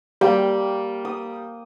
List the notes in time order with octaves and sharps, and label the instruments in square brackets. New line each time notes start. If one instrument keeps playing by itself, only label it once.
[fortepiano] G3 [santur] A#3 G5
[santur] D#6